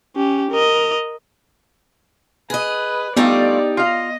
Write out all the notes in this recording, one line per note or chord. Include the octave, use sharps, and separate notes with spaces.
C#4 G4
A#4 D#5
G#4 B4 D#5
G3 A3 B3 D4 D#4 F4 G4 D5
F4 D#5 F5